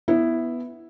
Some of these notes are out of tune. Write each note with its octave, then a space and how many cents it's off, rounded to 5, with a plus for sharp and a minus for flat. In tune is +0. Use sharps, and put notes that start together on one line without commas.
B3 +0 E4 +0 B4 +0